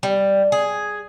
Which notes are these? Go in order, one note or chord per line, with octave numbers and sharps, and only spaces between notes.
G3
G#4